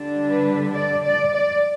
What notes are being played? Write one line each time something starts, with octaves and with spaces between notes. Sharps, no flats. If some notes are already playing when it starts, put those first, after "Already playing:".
Already playing: D3 G3 D4
B4
D5
D5
D5